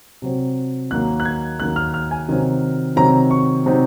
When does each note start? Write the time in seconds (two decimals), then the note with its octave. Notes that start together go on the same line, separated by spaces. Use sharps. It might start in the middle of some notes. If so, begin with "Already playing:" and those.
0.22 C3 F#3 C4
0.91 D#2 D#3 F#3 A#3 F#6
1.20 F#6
1.25 G#6
1.59 D#2 D#3 F#3 A#3 F#6
1.76 F6
1.94 F6
2.11 G#5
2.28 C3 D#3 F#3 C4
2.96 C3 D#3 F#3 C4 A#5
3.31 C#6
3.66 C3 F#3 C4 D#4